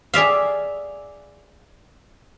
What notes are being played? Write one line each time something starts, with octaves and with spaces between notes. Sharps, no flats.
G#4 D5 E5 F5